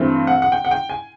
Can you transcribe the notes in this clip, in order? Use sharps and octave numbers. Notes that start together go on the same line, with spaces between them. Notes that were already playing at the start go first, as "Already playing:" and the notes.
Already playing: G2 E3 A3 C4
F#5
F#5
G5
F#5
G5
G#5